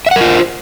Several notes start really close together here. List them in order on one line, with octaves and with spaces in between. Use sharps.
E5 F#5 A#4 F4 C5